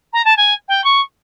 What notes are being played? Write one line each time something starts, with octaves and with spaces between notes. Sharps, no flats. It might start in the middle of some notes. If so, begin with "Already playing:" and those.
A#5
A5
G#5
G5
C#6